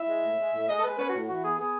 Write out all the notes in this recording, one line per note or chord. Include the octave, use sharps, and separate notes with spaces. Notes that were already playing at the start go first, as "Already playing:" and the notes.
Already playing: E4 E5
G#3
A2
G#3
A2
G#3 D#5
A4
G#3 B4
C#4 B4
A2 F#4
E3 F#4
B3 G#4
B3 G#4